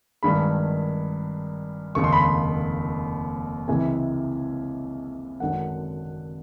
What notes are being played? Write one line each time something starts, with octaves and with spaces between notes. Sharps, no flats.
G#1 G2 D#3 G#3 B5
F1 D#2 C#3 C#6
C6
B5
C6
C#2 C3 E3 G#3 G#5
G#1 F#2 D3 F#3 F#5